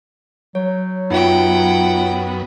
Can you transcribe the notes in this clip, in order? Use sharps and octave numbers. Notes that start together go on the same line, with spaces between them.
F#3 C#5
F#2 B3 D#4 F4 E5 F#5 G5